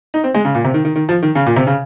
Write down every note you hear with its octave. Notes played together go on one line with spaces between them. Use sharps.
D#4
C4
G#3
C#3
A#2
C3
D#3
D#3
D#3
F3
D#3
C#3
A#2
C3
C#3